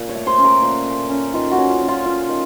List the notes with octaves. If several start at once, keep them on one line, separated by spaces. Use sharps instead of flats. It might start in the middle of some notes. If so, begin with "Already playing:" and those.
Already playing: A#2
C#5
A3
C5
C#4
A#4
A#2
A3
C#4
D#3 F4
F#4
C#4
F4
C#4
F4
C#4 F4
D#3